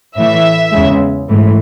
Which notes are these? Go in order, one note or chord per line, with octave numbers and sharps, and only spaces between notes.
A2 E3 A3 E5
E2 C#3 G#3
G#2 E3 A3